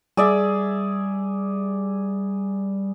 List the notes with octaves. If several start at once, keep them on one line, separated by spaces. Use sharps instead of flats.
G3 G#4 D5 E5